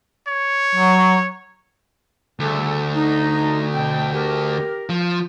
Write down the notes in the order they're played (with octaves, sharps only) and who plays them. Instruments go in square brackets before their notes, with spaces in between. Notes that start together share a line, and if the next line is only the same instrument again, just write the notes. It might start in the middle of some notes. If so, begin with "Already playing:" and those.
[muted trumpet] C#5
[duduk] F#3
[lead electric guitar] D2 [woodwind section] C#3 G3 A4
[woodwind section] D#4
B2 C4 G5
G4 A#4
[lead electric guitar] F3